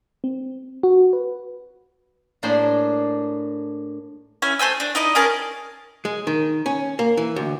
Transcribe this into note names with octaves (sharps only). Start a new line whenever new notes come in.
C4
F#4
B4
A2 A#3 D4 G#4 C5 C6
C#4 E4 G#5
A3 C5 G#5 E6
D4
D#4 E4 D5 D#5
C#4 G#4 A#4 A5
G#3
D#3
C#4
A#3
E3
D2